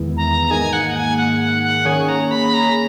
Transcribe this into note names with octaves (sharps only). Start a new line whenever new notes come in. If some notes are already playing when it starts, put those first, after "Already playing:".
Already playing: E2 D#3 G#3 B3 E4
A#5
G#2 D#3 A#3 D#4 G#4 G#5
F#5
F#5
G#5
F#5
F#5
F#5
D#3 A#3 C#4 G#4 C#5 G#5
A#5
B5
A#5